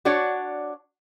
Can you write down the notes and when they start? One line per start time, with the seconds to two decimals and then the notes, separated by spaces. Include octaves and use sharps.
0.05 D4 F#4 C#5 D5 F#5